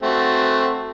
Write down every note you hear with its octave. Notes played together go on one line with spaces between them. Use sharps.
A3 C4 F#4